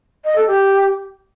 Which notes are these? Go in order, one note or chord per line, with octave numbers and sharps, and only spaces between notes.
D#5
A4
G4